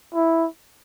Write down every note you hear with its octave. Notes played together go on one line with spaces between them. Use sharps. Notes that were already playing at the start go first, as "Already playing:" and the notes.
E4